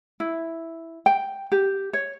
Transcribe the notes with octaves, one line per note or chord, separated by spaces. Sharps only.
E4
G5
G4
C#5